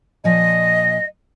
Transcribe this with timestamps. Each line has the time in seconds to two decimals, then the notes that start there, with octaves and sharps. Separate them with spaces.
0.24 A#2 F3 D#5 G#5